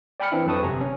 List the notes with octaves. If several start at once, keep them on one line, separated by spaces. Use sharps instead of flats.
D5 G5 G#5 B5 F6 C#7
E3 C4 D4 E4
F2 F#3 B4 A5 C#6 D#6
G1 C3 G#5 A#5
C#4